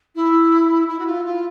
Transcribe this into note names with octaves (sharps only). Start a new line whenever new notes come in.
E4
E4
F#4
F4
F4